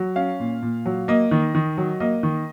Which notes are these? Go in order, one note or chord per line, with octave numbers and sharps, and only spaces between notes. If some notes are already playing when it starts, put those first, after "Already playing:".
Already playing: F#3
C#4 F5
A#2
A#2
F#3
A#3 D#5
D#3
D#3
F#3
A#3 D#5
D#3